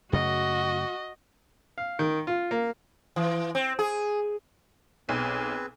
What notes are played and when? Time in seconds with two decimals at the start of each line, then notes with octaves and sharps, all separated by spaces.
0.13 F#2 C#3 A3 F#4 D#5
1.78 F5
1.99 D#3
2.27 F4
2.51 A#3
3.16 E3
3.55 C4
3.79 G#4
5.09 B1 C4 G#4 B4